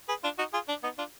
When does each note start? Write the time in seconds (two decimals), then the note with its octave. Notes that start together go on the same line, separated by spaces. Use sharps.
0.09 G#4 B4
0.23 D4 F4
0.38 D#4 F#4
0.54 F4 G#4
0.69 D4
0.84 B3 D#4
0.98 D4 F4